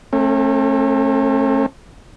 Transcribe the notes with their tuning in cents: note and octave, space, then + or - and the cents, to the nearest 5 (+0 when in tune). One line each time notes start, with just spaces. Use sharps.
A3 +0 C#4 -45 A4 +45